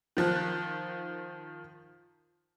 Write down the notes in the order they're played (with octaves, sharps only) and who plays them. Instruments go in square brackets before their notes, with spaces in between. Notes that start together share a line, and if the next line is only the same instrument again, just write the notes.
[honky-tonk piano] D#3 F3 F#6